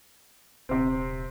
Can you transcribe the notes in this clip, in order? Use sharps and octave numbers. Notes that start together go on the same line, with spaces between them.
D#1 C3 C4